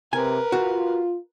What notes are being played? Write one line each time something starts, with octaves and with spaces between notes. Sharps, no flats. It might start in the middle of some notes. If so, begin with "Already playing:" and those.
C3 A#4 B4 G#5
F4 F#4